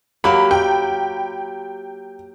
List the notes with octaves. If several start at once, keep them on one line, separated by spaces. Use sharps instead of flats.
F#3 A#3 G4 B5
G5